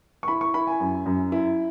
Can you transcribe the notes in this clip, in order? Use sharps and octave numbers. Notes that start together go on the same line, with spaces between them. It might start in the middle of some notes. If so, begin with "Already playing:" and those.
C#6
E4 B5
C#6
E4 B5
G#5
F#2
F#2
E4